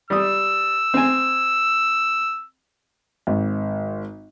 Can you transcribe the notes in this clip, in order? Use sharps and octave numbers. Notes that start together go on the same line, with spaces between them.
G3 D#6 E6
C4 G#5
G#1